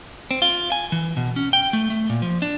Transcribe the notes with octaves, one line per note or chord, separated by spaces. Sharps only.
C4
F4
G#5
E3
B2
C#4
G5
A3
A3
A#2
F3
D4